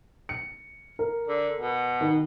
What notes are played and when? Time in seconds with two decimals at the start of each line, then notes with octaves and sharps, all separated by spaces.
0.29 C#7
0.99 A#4
1.28 D3
1.59 B2
2.01 D#3